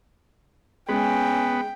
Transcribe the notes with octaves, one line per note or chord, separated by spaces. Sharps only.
G#3 B3 C#4 G5